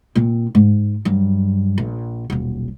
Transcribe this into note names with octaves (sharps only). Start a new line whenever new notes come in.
A#2 C4
G#2
G2 F#3
A#1
D#1 B1